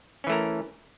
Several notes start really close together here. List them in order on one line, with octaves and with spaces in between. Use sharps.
C#4 E3 A3 A#4